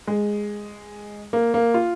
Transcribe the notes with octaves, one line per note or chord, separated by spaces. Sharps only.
G#3
A#3
A#3
F4